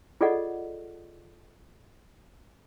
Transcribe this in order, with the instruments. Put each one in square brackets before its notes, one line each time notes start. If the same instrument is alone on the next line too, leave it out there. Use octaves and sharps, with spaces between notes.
[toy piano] F4 G#4 A4 D5 D#5 F#5